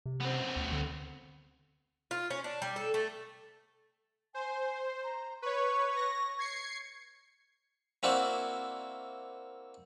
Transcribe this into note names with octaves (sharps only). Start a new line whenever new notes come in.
C3
B3 C4
D2
D3
F4
C#4
D4
G3
A4
A3
C5 G#5
A#5
B4 C#5 C#6
A#6
G#6 C7 C#7
A#3 C4 E4 F#4 D5